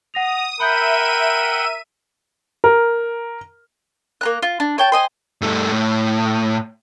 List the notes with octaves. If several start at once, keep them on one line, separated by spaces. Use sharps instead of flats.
F#5 D#6 A#6 F7
A#4 E5 F#5 G5 B5 G6 D#7
A#4
A#3 A#5 F#6
F4
D4
C#5 G5 A5
C5 D#5 G#5
G2 A3
A2